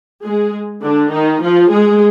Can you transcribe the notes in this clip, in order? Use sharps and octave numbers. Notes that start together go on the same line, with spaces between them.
G#3 G#4
D3 D4
D#3 D#4
F3 F4
G#3 G#4